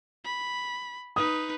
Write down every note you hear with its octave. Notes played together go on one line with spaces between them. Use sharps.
B5
D#4 B4 D#6